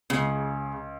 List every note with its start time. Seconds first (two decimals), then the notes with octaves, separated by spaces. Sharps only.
0.10 C#2 C#3